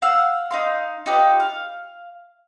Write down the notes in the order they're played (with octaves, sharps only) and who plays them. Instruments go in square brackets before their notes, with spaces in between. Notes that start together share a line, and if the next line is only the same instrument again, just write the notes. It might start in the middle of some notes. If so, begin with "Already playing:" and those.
[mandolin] F5 F#5 E6 F6
D#4 F5 C6
D#4 F4 G4 B4
F5